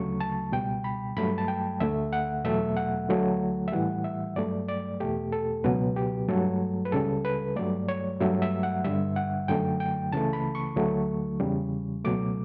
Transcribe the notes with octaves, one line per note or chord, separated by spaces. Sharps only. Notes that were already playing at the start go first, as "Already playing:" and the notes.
Already playing: D2 C#3 F#3 A3 C#6
A5
C#2 B2 G3 G5
B5
G2 F#3 A3 B5
A5
G5
D2 D3 A3 E5
F#5
E2 B2 F#3 A3 E5
F#5
D2 D3 F#3 A3
E5
A2 E3 G3 F#5
E5
G2 F#3 A3 D5
D5
E2 B2 A3 G4
A4
C#2 B2 F#3 B4
G4
G2 F#3 A3 A4
B4
C#2 C#3 G3 A4
B4
G2 F#3 A3 D5
C#5
G2 F#3 A3 E5
E5
F#5
G2 D3 G3 E5
F#5
F#2 D3 F#3 A3 G5
G5
C#2 C#3 E3 A3 A5
B5
C#6
D2 D3 F#3 A3
E2 C#3 G3
C#2 B2 F#3 A3 D6